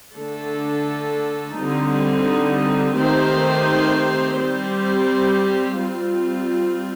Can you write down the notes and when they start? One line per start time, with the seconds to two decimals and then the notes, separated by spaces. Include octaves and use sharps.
0.14 D3 A3 D4 A4
1.55 D3 G3 C4 D#4
2.96 D#3 A3 C4 G4 C5
4.37 G3 C4 G4 C5
5.77 G3 C4 F4